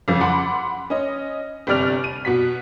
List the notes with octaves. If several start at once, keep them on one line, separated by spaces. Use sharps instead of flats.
F2 C#3 F3
F#5 B5 C6 D6
C#4 D#5
G1 C3 G4 D5 F6 F7
D#7
B2 F#4 B6